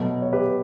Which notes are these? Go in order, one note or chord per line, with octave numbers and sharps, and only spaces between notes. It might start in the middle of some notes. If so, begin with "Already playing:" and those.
Already playing: B2 F#3 A3
C#5
G4 B4